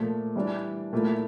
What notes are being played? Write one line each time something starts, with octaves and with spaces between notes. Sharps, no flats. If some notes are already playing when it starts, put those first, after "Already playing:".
Already playing: A#2 F3 A3
E3 G3 D4
A#2 A3 E4